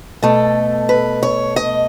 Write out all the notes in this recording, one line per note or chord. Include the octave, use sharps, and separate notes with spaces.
B2 A3 A4
B4
C#5
D#5